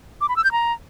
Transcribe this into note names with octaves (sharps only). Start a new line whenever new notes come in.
D6
B5
E6
G6
A#5